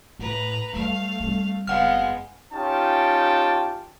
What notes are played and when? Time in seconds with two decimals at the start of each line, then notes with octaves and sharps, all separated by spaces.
0.19 A2 A#3 B4 A#5
0.73 F#3 G3 A3 F5
1.20 G3 C4
1.67 F#1 G#3 B3 F5 F#5 F6
2.53 C#4 D#4 F4 G4 G5 A5